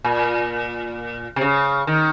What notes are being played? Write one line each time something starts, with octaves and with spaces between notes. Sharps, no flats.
A#2
C3
C#3
D#3